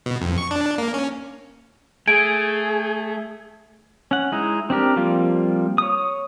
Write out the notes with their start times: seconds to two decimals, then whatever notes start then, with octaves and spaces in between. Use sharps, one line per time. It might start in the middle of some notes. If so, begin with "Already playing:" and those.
0.06 B2
0.21 F2
0.38 C#6
0.51 D4
0.78 A#3
0.94 C#4
2.08 A3 G#4 G#5 D7
4.11 C#4 F#5
4.32 G#3 D#4 E4
4.70 C4 D4 G4 A#4
4.96 F3 G3 A#3 C4 F4
5.78 C#5 D#6